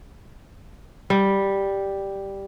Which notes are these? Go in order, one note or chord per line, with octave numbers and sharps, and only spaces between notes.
G3